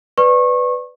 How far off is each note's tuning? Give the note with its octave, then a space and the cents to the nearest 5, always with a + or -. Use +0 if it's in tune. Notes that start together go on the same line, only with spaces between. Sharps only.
B4 +10 D5 +5 C#6 -25